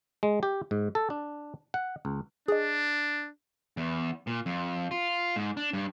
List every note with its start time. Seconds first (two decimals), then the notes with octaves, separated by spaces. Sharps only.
0.23 G#3
0.43 G4
0.71 G#2
0.95 A4
1.10 D4
1.74 F#5
2.05 C#2
2.48 D4 G#4 D#5
3.77 E2
4.27 A#2
4.46 F2
4.91 F4
5.36 G#2
5.57 D4
5.73 G2